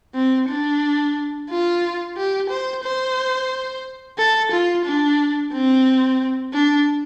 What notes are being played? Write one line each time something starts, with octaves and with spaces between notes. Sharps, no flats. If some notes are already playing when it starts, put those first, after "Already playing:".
C4
D4
F4
G4
C5
C5
A4
F4
D4
C4
D4